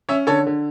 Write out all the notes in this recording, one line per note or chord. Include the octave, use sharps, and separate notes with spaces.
C#4 C#5 E5
D3 A4 C#5
D3